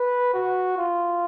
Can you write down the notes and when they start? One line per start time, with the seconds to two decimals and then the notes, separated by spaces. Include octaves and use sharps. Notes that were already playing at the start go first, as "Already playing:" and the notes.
Already playing: B4
0.34 F#4
0.77 F4